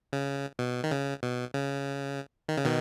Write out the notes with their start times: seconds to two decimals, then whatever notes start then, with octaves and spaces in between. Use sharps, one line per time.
0.13 C#3
0.59 B2
0.84 D#3
0.91 C#3
1.23 B2
1.54 C#3
2.49 D#3
2.57 C#3
2.65 B2 D#3